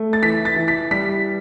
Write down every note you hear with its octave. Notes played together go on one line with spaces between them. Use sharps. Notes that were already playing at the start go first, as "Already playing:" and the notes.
Already playing: A3
A6
E3 B6
A6
E3
B6
G3 B6